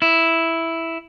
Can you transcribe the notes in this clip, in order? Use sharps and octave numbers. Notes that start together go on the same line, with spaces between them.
E4